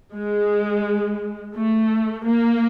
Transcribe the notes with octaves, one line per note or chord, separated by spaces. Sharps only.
G#3
A3
A#3